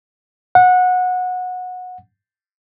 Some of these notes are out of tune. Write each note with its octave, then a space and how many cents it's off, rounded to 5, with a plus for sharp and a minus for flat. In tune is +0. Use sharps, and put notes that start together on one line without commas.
F#5 -20